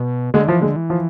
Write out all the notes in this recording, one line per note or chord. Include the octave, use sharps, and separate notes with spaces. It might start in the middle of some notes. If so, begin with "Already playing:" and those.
Already playing: B2
D3 G#3
E3 F3
D3 G#3
E3
F3